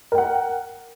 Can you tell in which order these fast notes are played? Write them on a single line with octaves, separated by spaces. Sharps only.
A#4 G5 F#5